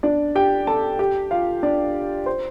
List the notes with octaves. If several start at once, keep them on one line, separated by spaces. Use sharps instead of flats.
D4 D5
G4 G5
A4 A5
G4 G5
F4 F5
D4 D5
C5